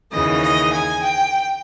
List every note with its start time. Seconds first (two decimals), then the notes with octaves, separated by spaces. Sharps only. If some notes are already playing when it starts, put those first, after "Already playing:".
0.12 D#2 C#3 E3 D#5
0.42 D#5
0.72 G#5
1.02 G5